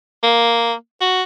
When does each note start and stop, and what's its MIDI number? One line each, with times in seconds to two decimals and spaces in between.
0.23 0.74 58
1.01 1.23 66